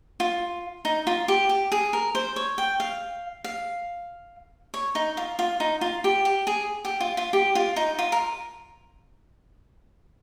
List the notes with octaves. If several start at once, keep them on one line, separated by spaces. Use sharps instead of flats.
F4
D#4
F4
G4
G4
G#4
A#4
C5
C#5
G5
F5
F5
C#5
D#4
F4
F4
D#4
F4
G4
G4
G#4
G4
F4
F4
G4
F4
D#4
F4
A#4